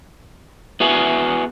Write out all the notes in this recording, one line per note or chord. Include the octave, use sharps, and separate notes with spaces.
B3 E4 F#4 G#4